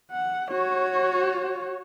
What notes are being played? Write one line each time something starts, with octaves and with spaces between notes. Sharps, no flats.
F#5
F#4 C#5